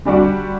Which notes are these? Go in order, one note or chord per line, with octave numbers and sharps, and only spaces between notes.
D3 G3 D4 F#4